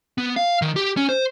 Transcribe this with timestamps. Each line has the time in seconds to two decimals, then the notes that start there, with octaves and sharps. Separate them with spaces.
0.18 B3
0.36 F5
0.62 D#3
0.76 G4
0.97 C#4
1.09 C5